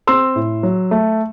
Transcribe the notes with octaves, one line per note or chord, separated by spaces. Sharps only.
C4 C6 E6
A2
F#3
A3